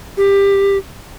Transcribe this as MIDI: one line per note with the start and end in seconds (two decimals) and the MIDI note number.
0.17 0.77 67